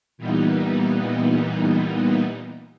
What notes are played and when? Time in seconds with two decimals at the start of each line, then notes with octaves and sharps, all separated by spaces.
0.18 A#2 E3 G3 B3 D#4